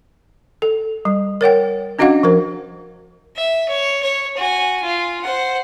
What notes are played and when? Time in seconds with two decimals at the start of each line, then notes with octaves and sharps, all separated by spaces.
0.62 A4
1.05 G3
1.41 A#4 C#5 F#5 G5
1.99 C#4 D4 F#4 D#5 F5 F#5
2.23 F3 A#4 C5
3.36 E5
3.69 C#5
4.03 C#5
4.37 F#4 G#5
4.83 F4
5.23 C5 F#5